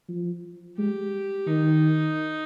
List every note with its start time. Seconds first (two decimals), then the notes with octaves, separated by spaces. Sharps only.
0.09 F3
0.77 G#3 G4
1.47 D#3 D#4